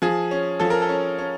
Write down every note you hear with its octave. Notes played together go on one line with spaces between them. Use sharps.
F3 G#4
C#4
F3 A4
A#4
A4
C#4
C#4